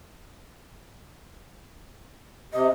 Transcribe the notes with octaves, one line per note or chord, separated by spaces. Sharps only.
C3 D#5